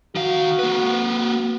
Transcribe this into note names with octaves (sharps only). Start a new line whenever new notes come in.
D#3 F#4 F5
A#3 B4